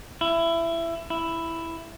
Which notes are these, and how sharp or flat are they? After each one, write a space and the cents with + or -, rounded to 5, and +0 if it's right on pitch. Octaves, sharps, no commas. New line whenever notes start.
E4 +20
E4 +5